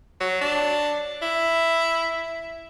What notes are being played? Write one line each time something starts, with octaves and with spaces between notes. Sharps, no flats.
F#3
D4
E4